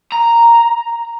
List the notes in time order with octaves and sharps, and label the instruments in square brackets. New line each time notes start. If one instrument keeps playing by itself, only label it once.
[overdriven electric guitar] A#5